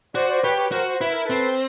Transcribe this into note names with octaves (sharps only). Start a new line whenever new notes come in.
F#4 C5 D5
C5 D5
G4 B4 C#5
B4 C#5
F#4 A#4 C5
C5
E4 B4
A#4
A4 B4
C4